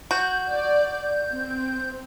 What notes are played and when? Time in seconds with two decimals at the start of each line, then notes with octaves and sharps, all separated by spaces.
0.11 F#4 G6
0.51 D5
1.33 C4